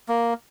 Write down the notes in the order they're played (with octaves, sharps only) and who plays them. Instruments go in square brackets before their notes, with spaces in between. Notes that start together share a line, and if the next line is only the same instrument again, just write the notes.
[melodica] A#3